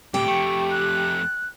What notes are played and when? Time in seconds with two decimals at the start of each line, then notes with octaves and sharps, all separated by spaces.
0.14 A2 C3 G4 G5 D6
0.27 F2 A3 C#6
0.71 F#6